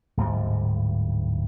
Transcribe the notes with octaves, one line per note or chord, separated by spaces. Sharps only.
D1 G#2 G3